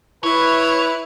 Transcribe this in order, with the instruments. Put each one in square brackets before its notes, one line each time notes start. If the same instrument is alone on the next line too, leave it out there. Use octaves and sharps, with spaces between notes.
[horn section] E4 B4 [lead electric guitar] C#5